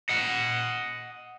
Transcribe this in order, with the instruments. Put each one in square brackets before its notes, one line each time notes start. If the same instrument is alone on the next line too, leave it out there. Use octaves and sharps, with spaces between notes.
[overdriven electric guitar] D#5 F#5